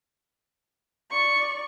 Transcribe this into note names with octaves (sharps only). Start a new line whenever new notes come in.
D5 C#6